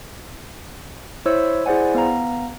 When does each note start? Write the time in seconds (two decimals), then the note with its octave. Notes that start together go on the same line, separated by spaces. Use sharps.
1.26 E4 C5 C#5 E5 E6
1.66 E4 G#4 C5 D5 F#5 G#5
1.94 B3 F5 A#5